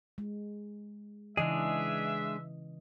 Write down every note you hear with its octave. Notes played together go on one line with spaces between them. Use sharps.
G#3
C#3 E3 G#3 D4 G#4 D#5 E5